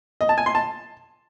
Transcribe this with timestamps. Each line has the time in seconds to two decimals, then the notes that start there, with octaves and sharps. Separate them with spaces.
0.21 D#5
0.29 A5
0.38 G#5
0.46 C6
0.55 A5